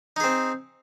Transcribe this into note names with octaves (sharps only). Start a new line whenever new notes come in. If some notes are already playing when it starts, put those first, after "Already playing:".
C4 D#4 G#4